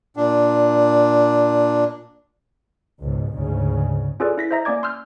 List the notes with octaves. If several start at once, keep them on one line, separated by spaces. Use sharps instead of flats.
A#2 D4
C#2 G#2 B2
D2 G#2 C#3
C#4 F4 G#4 A4 B4 D5
E4 A#6 B6
C5 D#5 E5 A#5 A#6
A#3 C#4 D5 D6 G#6
C6 E6 F6 G6